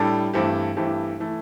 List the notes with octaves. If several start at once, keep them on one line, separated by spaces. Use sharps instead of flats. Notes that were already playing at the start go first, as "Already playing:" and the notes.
Already playing: A2 G3 D4 A4
G2 E3 A3 C4 G4
G2 E3 A3 C4 G4
E3 A3